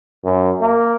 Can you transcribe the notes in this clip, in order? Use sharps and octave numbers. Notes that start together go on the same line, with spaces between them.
F#2
A#3